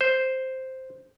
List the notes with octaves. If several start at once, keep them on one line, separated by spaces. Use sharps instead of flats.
C5